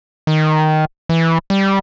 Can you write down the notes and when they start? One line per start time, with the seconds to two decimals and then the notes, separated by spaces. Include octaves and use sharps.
0.27 D#3
1.09 E3
1.50 G3